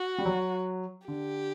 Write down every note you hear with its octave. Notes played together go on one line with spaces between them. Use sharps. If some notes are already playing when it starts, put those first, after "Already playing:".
Already playing: F#4
G3
F#3
D3 G4